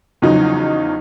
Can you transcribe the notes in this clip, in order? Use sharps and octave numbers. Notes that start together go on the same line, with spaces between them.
E2 C#3 F3 F#3 D#4